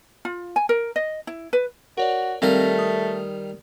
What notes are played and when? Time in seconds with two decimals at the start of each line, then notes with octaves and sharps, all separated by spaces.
0.25 F4
0.56 G#5
0.69 A#4
0.96 D#5
1.27 E4
1.53 B4
1.97 F#4 A#4 C#5 D5
2.42 D#3 G3 A3 C4 A#4 F5
2.79 D#6